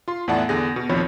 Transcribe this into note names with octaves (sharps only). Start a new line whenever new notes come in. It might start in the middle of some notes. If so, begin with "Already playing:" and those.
F4 C6
E2 A2 E4 D5 F#5 A5
E2 D3 G4 G#4 A#6
B2
A#1 D#2 F3 C4 C#5 B5